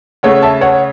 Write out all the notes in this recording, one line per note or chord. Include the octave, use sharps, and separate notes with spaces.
C#3 A3 C#5 F#5
E5 A5
C#5 F#5